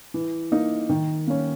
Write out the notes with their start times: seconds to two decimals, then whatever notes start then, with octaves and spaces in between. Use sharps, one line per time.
0.14 E3
0.52 A#3 D#4
0.89 D#3
1.27 A#3 C#4